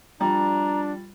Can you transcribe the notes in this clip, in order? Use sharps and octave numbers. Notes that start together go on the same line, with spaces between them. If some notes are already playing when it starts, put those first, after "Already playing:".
F3 G3 D4 A#5